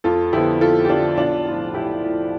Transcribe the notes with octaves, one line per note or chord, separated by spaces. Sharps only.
F2 F4 A4
D3 F3 B3 E4 G4
F2 F4 A4
G4
D3 F3 B3 D4 F4
B1 D4 F4
A2 F3
B1 E4 G4
A2 F3